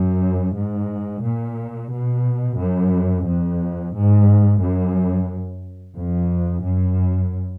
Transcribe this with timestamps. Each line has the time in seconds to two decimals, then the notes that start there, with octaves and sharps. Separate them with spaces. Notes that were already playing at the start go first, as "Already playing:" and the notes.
Already playing: F#2
0.55 G#2
1.22 A#2
1.91 B2
2.59 F#2
3.25 F2
3.94 G#2
4.61 F#2
5.97 F2
6.65 F#2